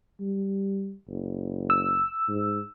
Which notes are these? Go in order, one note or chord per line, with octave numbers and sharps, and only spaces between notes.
G3
F#1
E6
G#2